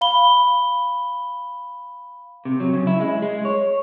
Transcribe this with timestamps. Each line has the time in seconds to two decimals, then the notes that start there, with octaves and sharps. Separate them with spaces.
0.01 F5 B5 G7
2.45 C3
2.60 F#3
2.74 C#3
2.87 E4
3.00 G#3
3.22 G#3
3.45 C#5